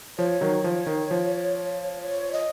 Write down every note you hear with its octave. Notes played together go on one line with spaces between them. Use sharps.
F3 C#5
D#3 F#3
F3
D#3
F3
C#5
D#5